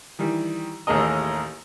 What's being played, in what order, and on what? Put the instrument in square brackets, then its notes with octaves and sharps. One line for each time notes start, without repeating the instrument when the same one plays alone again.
[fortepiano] D#3 E3 G3
A1 D#2 A3 G#4 A#4 D#5